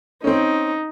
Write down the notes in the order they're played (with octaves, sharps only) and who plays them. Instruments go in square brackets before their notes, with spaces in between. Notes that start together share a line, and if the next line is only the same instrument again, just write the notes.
[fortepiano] C4 C#4 [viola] D#4